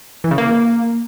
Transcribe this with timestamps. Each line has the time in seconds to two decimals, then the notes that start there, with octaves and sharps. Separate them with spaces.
0.24 E3
0.31 C#3
0.38 A#3